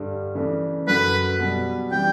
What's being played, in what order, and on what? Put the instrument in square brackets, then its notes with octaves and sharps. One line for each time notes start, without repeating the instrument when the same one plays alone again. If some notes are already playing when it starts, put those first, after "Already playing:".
Already playing: [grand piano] G2 D3 G3
C#3 E3 A3 D4
[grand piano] F#2 D3 F#3 [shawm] B4
[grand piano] B2 G3 B3
[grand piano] C#3 E3 G3 [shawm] G5